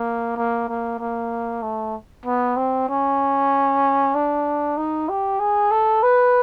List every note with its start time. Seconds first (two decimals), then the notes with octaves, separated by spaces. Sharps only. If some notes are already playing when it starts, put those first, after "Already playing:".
Already playing: A#3
0.37 A#3
0.68 A#3
1.00 A#3
1.62 A3
2.25 B3
2.57 C4
2.89 C#4
4.15 D4
4.77 D#4
5.09 G4
5.40 G#4
5.71 A4
6.03 B4